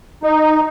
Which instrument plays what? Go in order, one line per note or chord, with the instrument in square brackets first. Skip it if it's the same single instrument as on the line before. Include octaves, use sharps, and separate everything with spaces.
[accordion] D#4